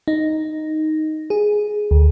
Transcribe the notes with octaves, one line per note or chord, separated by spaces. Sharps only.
D#4
G#4
D2